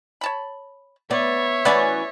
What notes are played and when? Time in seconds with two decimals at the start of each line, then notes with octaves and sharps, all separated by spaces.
0.21 C#5 A5 B5
1.11 B3 C#5 D5 E5
1.65 E3 B3 C#4 F#4 B4 D5